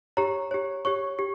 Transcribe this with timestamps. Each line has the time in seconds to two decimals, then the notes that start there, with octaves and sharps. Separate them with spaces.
0.17 G4 C#5 A#5
0.51 G4 C#5
0.85 G4 C#5 C#6
1.19 G4